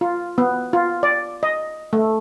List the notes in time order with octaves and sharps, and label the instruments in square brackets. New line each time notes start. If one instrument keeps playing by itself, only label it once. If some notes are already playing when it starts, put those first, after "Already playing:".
[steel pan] F4
B3
F4
D5
D#5
A3